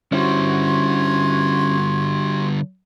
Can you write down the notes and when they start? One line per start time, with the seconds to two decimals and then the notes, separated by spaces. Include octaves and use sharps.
0.12 D3 G3 C#4 E4 F#4 C5 C6 G#6